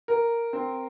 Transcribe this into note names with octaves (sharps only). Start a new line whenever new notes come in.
A#4
C4